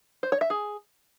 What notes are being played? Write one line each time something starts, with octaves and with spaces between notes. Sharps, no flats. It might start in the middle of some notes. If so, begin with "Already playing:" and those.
C5
C#5
E5
G#4